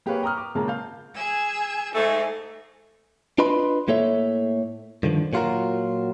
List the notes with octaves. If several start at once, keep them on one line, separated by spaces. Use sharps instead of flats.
A#3 G4 G#4 B4 C#5 F5
G5 A#5 C#6 D#6 F6
D6
A#2 C#3 G#3 A#4 A5 A#5
F5 G6
G#4 G#5 E6
G#2 A3 D#4 G#4
D4 F4 B4 D#5 B5 C6
A2 A#3 A4 C#5 E5
G2 D3 D#3 F3
A#2 F#3 F4 F#4 A#4